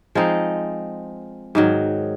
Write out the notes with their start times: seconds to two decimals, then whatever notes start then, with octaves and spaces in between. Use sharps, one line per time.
0.15 F3 G#3 C4 D#4
1.55 G#2 D#3 F#3